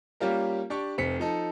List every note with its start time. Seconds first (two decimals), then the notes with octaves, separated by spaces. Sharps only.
0.20 G3 A#3 C#4 F4 G4 A#4
0.70 D4 G4 D5 C#6
0.98 F1 C4 B6 C#7
1.20 F3 D#4 A4